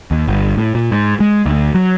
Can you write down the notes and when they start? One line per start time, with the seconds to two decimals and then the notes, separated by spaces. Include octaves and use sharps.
0.11 D#2
0.28 G1
0.57 A2
0.75 A#2
0.92 G#2
1.20 G#3
1.46 D2
1.74 F#3